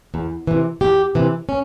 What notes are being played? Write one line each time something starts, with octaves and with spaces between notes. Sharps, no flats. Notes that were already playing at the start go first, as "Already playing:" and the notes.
E2
C3 E3
E2 G4
C3 E3
C#4